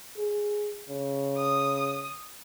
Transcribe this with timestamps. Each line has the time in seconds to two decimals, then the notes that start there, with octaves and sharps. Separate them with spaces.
0.18 G#4
0.89 C#3
1.38 D#6